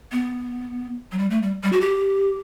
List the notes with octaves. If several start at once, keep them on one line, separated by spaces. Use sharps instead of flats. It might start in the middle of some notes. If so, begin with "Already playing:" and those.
B3
F#3
G3
A3
G3
G3
F#4
G4